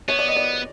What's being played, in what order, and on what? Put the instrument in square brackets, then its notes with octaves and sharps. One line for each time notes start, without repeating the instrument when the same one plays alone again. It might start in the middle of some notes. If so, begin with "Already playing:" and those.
[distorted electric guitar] B3 [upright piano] C#5
[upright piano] D5
D#5
D5